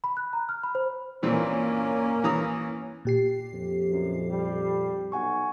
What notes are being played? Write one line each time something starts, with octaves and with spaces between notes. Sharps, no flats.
B5
F#6
A#5
F6
B5
C5
A#2 E3 A#3 C4 C#4
E3 A#5 D#6
A#2 G4 C7
F2
F#2
G3
B1 F#5 G#5 C#6